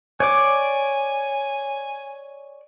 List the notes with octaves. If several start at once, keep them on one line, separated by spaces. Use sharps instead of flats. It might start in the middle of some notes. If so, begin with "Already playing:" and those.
C#5 D5 G#5 D6